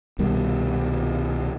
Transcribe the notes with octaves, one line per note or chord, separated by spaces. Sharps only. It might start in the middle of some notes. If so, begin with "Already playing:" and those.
C2 B2 D#3 G3